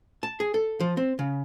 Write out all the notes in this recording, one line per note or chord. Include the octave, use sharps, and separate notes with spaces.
A5
G#4
A4
F3
C4
C#3